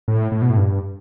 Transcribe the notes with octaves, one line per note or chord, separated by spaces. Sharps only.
A2
A2
B2
A2
G2